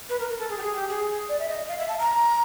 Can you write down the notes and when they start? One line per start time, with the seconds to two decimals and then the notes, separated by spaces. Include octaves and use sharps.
0.09 B4
0.19 A#4
0.29 A#4
0.39 A4
0.49 G#4
0.57 G4
0.62 G#4
0.75 G4
0.89 G#4
1.29 D5
1.39 E5
1.49 D#5
1.69 F5
1.79 E5
1.89 A5
1.99 A#5